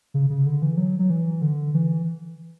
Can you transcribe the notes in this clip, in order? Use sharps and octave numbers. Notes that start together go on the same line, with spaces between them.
C#3
C#3
D3
E3
F#3
F#3
E3
D3
E3